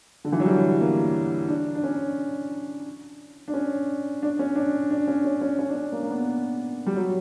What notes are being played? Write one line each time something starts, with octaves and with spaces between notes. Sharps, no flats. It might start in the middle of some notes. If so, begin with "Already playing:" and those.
D3
E3
F#3
G3
A#3
D4
D4
C#4
D4
C#4
D4
C#4
D4
D4
C#4
C#4
C#4
C#4
D4
C#4
A#3
A#3
B3
G3
F#3